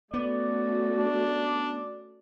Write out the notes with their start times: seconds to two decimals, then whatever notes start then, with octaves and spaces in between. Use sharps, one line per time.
0.14 A3 B3 C#4 F#4 D5
0.99 D4